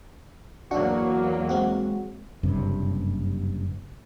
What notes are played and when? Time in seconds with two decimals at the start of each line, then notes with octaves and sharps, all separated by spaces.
0.71 E2 F#3 A#3 D4 F#4 C#6
1.49 G#3 C4 F#4
2.43 F#1 G2 C3